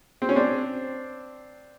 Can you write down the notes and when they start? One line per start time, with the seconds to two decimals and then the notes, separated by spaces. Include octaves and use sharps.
0.22 C4
0.29 C#4
0.36 C4 D4